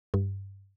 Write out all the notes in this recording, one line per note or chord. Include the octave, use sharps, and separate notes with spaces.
G2